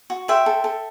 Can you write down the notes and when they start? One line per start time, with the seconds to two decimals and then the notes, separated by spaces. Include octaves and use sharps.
0.10 F#4
0.28 C5 E5 G5
0.46 A4
0.64 A4